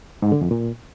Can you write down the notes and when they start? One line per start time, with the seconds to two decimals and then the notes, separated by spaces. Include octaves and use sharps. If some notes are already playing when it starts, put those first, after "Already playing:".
0.22 G#2
0.32 D3
0.41 F2
0.51 A#2